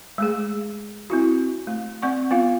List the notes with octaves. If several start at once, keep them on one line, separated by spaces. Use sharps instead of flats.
G#3 A3 G#4
C4 E4 F#4
A3
C4 D5 F#5 C#6
B3 F4 F5